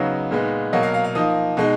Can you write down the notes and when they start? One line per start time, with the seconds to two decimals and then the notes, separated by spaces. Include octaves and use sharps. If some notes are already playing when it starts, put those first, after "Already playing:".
Already playing: C#3 F#3 B3 D#4 F5
0.31 A#2 G#3 B3 D#4
0.73 B2 F#3 A#3 D#5
0.83 F5
0.94 F5
1.04 F5
1.15 F3 A#3 D#4 D#6
1.57 B2 G#3 D#4